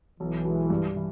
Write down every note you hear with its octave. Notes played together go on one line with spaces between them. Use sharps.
B1 E3
B2 G#3
G2
E3